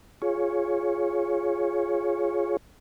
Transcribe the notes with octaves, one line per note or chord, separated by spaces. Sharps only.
F4 G#4 C#5